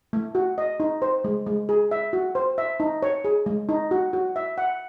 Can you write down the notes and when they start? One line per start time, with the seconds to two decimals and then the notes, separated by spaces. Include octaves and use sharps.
0.13 A3
0.35 F#4
0.58 D#5
0.80 D#4
1.02 C5
1.24 G#3
1.46 G#3
1.69 G#4
1.91 E5
2.13 F#4
2.35 C5
2.58 E5
2.80 D#4
3.02 C#5
3.25 G#4
3.46 G#3
3.69 D#4
3.91 F#4
4.13 F#4
4.36 E5
4.58 F#5